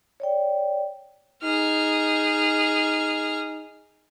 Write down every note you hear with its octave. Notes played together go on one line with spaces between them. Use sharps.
C#5 D5 G5
D#4 G#4 F6